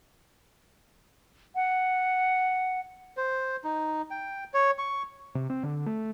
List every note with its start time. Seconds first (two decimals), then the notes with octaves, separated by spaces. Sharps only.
1.55 F#5
3.17 C5
3.64 D#4
4.11 G5
4.54 C#5
4.79 C#6
5.35 C3
5.50 C4
5.63 D3
5.86 A3